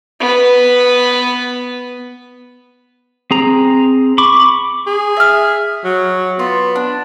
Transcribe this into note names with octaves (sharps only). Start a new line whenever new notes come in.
B3 B4
C4 G#4 A#5
B5 C#6 D6
G#4
E5 F6
F#3
B3 F4
D4